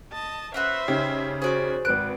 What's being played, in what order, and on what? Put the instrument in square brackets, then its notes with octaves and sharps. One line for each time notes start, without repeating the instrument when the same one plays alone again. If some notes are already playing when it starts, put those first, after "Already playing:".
[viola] D#5 A5
[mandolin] C#4 F#4 B4 [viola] C5 E5
[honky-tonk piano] C#3 D#4 G4 [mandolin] F6
[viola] F#4 [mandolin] G#4 D5 D6 [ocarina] C5
[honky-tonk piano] G#1 B4 D7 [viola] C4 [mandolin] F#6